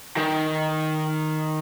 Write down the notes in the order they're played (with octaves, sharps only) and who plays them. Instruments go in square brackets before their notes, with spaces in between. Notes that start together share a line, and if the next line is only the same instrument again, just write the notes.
[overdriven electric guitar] D#3